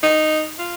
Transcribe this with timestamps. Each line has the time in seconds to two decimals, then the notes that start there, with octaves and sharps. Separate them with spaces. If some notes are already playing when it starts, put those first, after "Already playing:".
0.03 D#4
0.59 F4